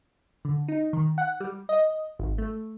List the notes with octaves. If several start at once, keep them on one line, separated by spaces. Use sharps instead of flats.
D3
D#4
D#3
F#5
G3
D#5
G#1
A3